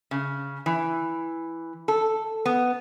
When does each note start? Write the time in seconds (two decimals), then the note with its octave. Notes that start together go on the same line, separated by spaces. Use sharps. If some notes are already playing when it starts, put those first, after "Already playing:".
0.11 C#3
0.66 E3
1.88 A4
2.46 B3